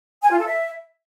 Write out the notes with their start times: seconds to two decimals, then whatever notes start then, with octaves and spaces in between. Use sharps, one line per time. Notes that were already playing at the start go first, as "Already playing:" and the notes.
0.22 G#5
0.30 F4
0.38 A4
0.46 E5